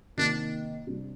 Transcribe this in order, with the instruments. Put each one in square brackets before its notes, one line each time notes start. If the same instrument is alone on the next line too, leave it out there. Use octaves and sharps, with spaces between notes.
[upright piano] C3 D#3 A#3 D#4 [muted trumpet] D4
[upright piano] C3 G3 D4